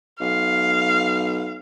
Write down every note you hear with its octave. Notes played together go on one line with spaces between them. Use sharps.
B1 F5